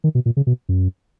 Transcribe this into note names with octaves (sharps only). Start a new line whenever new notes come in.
D#3
B2
A#2
C#3
B2
F#2